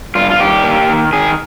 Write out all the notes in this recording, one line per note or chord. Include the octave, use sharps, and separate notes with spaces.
G2 F4
F4
D#3 G4
A#3
D#3
D#3 G#4